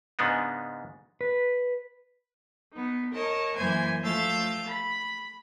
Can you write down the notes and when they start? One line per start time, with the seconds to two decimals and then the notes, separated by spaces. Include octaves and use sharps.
0.19 G#2 C#3 G#3 B3 D4 D#4
1.21 B4
2.72 B3 D#4
3.14 A#4 C#5 D#5 A5
3.57 F#2 E3 A#3 C5 G#5 G#6
4.02 F3 A3 F5 E6 G6 A6
4.66 B5